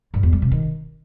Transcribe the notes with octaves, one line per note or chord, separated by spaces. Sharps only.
G2
E2
G3
C3
D#3